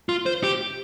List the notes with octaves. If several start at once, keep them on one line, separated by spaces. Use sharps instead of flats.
F4
C5
G4